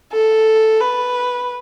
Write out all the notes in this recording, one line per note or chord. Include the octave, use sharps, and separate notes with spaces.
A4
B4